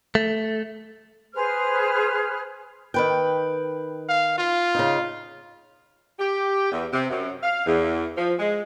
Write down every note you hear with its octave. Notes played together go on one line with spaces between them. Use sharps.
A3
G#4 B4 C5 F6
D#3 B4 G5
F5
F4
C#3 D#4
G4
E2
C3
F#2
F5
E2
F3
G#3